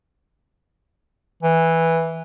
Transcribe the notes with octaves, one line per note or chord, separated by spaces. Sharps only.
E3